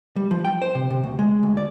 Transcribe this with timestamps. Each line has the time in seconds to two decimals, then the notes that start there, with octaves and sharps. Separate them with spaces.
0.16 G3
0.31 F3
0.45 G5
0.62 C5
0.75 C3
0.90 C3
1.03 D2
1.19 G#3
1.43 D2
1.57 D5